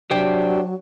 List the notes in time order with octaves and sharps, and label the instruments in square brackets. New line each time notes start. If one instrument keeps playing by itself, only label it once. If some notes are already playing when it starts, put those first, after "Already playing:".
[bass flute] F#3 [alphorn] D4 [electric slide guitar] G4 C5 G5